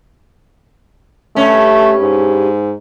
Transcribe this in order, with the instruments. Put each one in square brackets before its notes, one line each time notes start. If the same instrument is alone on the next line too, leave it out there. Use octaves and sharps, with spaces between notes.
[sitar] G2 C#4 [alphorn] A3
[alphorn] G#2